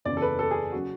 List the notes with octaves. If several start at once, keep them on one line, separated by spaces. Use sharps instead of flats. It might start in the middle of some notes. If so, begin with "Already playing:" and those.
F#1 E2 C#3 E3 D5
A4
B4
A4
G#4
C#3 F#3 F#4